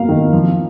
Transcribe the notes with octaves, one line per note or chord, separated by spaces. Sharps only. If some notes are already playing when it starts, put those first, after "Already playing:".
Already playing: A#3 A#4 F5
D#3
F3